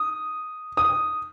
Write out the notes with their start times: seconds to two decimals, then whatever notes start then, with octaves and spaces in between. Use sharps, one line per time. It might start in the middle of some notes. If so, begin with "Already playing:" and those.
Already playing: D#6
0.77 D#6